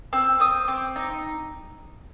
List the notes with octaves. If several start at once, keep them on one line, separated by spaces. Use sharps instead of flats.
C4 E6
C4 D#6
C4 D6
D#4